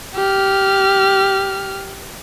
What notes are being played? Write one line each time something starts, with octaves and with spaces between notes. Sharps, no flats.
G4 F6